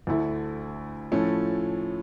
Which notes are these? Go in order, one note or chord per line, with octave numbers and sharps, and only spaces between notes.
D2 D3 A3 E4
A2 F3 A3 C#4